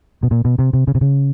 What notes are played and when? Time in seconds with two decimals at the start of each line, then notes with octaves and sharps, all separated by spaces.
0.23 B2
0.31 A#2
0.45 B2
0.59 C3
0.73 C3
0.88 C#3
0.95 C3
1.01 C#3